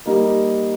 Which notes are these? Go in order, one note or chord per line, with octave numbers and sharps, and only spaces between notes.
G3 A#3 D#4 A#4